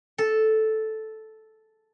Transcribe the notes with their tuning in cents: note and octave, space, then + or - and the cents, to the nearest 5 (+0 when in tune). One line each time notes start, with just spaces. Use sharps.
A4 -5